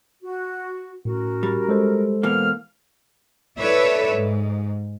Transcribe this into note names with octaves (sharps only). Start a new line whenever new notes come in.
F#4
A2 C#4 F#4 A#4
G3
G#3 A4 C5
B2 E3 A#3 F5 F6
E4 A4 B4 C#5 D5 E5
G#2